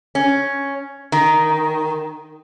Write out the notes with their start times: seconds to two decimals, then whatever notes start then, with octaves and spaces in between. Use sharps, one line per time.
0.15 C#4
1.12 D#3